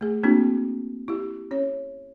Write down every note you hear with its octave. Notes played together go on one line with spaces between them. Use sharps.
A3 G#4
A#3 C4 D4 E4 F#4
E4 G4
C#4 C#5